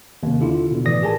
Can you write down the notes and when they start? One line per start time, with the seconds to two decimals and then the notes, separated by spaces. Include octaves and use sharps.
0.23 D#2 C3
0.41 D3 E4 F4
0.71 B2 D3
0.85 G#1 A2 E3 D5 D#6 A#6
1.02 G4 G#4 A#4 G#5 A5